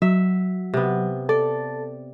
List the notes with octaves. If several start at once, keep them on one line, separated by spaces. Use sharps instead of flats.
F#3 E5
C3 B3
A4 D5